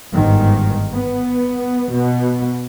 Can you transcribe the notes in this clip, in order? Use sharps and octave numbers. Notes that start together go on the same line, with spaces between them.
G1 G#2 D#3
B3
B2 B3